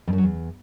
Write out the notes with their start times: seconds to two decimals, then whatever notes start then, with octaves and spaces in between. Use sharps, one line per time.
0.07 F2
0.13 F#2
0.18 F#3
0.23 E2